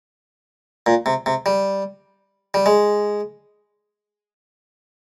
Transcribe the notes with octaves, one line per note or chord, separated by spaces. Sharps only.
A#2
C3
C3
G3
G3
G#3